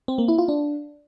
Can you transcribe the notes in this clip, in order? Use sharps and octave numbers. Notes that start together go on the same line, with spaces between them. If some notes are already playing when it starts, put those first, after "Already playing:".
C4
A#3
E4
F4
D4